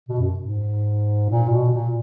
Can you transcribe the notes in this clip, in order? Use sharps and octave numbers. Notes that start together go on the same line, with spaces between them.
B2
F#2
G#2
A#2
B2
A#2